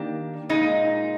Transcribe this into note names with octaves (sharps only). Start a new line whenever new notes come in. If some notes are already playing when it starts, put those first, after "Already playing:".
Already playing: D#3 A#3 D4 G4
A#2 G#3 D#4